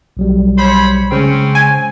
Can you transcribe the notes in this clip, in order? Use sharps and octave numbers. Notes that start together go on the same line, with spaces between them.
B1 F#3 G3
C5 C#5 B5
C#3 G#3 C4 C#4 C5
G#5